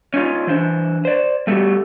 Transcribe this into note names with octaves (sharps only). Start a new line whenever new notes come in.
C#4 D#4 F4
E3 D4 C5
C5 D5
G3 A3 B3 E4 F#4 G4